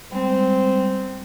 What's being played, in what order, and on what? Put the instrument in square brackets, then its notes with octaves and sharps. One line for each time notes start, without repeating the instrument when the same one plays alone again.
[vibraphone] G3 G#3 B3 [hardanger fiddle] C4